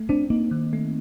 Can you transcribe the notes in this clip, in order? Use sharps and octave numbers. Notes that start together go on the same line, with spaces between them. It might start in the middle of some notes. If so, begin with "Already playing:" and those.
Already playing: A3
C4 D4
A#3 D#4
D#3
A3